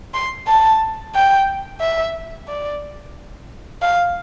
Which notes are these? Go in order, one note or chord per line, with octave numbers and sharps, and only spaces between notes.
C6
A5
G5
E5
D5
F5